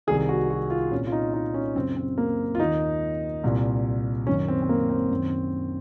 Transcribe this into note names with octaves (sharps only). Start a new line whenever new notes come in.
C2 C3 D#3 G#4
F#4
F#4
F4
C2 A#2 C#4
F4
D#4
D#4
C#4
F#2 C#3 C4
C4
A#3
F4
D#2 D#3 D#4
C2 A#2
F#2 D#3 C#4
C4
C4
A#3
C4
F#2 D#3